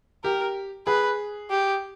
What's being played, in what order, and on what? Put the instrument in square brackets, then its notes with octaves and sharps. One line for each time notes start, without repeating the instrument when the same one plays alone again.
[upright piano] G4 [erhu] A#4
[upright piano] G#4 [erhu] B4
[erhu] G4